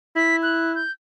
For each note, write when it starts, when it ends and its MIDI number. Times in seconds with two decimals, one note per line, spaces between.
0.16 0.82 64
0.16 0.36 95
0.43 0.73 90
0.75 0.91 91